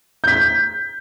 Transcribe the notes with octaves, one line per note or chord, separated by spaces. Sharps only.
G6 B6